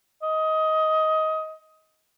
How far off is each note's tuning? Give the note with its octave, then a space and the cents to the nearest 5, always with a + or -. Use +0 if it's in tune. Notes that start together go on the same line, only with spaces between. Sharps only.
D#5 +15